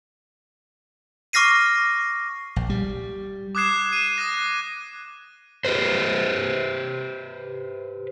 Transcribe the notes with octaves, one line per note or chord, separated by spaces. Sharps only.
C#6 D6 F6 A#6 C7 D#7
A#1
G3
D6 D#6 F#6 G#6 C7 E7
D#7 E7
D#6 F#6 A#6
G4 B4 C5